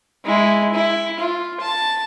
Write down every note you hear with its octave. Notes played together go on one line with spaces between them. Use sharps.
G#3 E4
E4
F4
A5